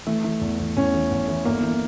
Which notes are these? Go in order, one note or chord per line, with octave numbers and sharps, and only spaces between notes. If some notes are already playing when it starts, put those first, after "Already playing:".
E3 A3
E3
E2
E2
E2 C#4
E3
E2
E3
G1 A#3
E3